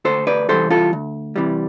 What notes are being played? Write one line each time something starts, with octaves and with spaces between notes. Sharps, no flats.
D2 A4 C5
B4 D5
C3 E3 G3 A4 C5
F4 A4
D2
C3 E3 G3